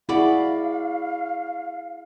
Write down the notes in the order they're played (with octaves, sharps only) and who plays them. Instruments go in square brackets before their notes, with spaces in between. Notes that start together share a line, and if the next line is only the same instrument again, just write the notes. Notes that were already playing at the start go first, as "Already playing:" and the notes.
[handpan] E4 G#4 [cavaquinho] F#4 D5 B5 [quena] F5